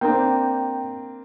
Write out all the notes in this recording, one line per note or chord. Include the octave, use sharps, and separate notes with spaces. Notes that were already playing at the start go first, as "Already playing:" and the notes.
A#3 C4 D4 G5